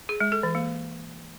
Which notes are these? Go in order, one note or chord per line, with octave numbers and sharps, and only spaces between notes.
G#4
G#3
A4
E3
A#3